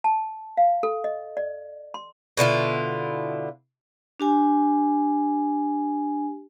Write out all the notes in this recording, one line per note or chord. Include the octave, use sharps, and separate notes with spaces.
A5
F5
A4
D#5
D5
C6
B2 D3 E4 F4
D4 G4 G#5